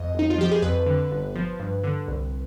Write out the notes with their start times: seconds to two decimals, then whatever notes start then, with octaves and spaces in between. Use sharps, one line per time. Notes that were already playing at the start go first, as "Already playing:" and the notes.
Already playing: F2 D#5
0.14 G1
0.19 D#4
0.30 F4
0.38 F3 G4
0.51 G#4
0.62 F2 B4
0.86 D3
1.11 G1
1.35 F3
1.60 G2
1.84 D3
2.08 C2